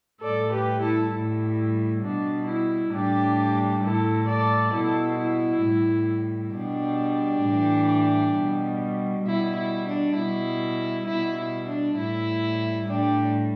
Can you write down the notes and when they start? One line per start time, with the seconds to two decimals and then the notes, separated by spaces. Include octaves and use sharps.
0.21 A2 G3 A4 D5
0.52 G4 B4
0.82 E4 A4
1.12 A2 G3 E4
2.03 B2 G3 D4
2.48 E4
2.93 A2 G3 D4 G4
3.83 A2 G3 E4 A4
4.29 A4 D5
4.74 B2 G3 E4 A4
5.19 E4
5.65 A2 G3
6.54 B2 G3 D4 G4
7.45 A2 E3 G3
8.36 B2 G3
9.26 B2 G3 E4
9.56 E4
9.87 D4
10.16 B2 G3 E4
11.07 B2 G3 E4
11.37 E4
11.67 D4
11.97 A2 G3 E4
12.87 A2 G3 D4 G4